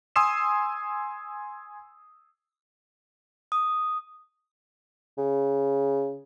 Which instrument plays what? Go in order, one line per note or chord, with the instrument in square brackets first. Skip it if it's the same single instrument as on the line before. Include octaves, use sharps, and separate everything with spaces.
[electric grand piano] G#5 C6 D#6 E6 C7 E7
[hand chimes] D#6
[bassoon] C#3